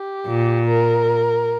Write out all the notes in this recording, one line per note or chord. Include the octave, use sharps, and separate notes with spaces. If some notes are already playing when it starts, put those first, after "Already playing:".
Already playing: G4
A#2
A#4